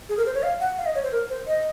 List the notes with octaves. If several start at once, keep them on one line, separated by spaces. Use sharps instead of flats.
G#4
A#4
C5
C#5
F5
F#5
F5
D#5
C#5
C5
A#4
C5
D#5